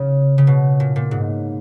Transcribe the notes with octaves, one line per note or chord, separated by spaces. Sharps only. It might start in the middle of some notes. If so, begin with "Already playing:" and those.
Already playing: C#3
C#3
B2
A#2
A#2
G#2